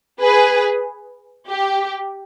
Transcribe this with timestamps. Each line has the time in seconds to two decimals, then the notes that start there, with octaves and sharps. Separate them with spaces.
0.22 G#4 B4
1.50 G4